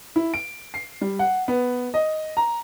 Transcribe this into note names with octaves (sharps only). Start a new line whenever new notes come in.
E4
D7
C7
G3
F#5
B3
D#5
A#5